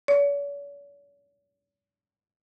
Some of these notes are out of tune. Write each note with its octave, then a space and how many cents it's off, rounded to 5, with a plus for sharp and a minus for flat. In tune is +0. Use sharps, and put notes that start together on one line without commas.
C#5 +45